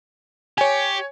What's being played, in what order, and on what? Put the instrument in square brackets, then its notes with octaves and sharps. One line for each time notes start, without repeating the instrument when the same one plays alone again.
[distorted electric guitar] G4 [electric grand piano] C#5 G#5